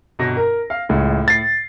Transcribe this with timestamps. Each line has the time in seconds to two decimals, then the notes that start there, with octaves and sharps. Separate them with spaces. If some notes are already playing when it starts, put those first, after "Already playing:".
0.19 G1 B2 A#6
0.37 A#4
0.70 F5
0.89 C#2 A2
1.28 A6 C7